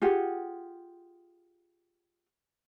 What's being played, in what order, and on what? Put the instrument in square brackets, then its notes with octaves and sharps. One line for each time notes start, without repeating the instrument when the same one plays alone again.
[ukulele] F4 G4 G#4 F#5